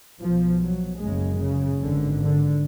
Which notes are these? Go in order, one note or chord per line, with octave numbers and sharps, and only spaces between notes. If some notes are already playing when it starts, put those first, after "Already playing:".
B1 B2 F3
F#3
F#1 F#2 C#3 G#3
C#3
G#1 G#2 D3
D3